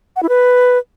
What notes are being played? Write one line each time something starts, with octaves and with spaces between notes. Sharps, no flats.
F#5
E4
B4